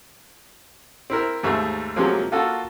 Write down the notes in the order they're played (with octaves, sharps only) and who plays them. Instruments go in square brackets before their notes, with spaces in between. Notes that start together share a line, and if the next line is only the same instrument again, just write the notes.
[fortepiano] C4 E4 A#4
D#2 G#2 A3
C3 F3 F#3 G#3 A#3 C4
A#3 F4 F#4 A4